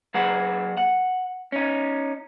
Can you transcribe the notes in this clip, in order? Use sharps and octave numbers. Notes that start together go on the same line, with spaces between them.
F#3 A#3 G#4 B4 F#5
F#5
C#4 D#4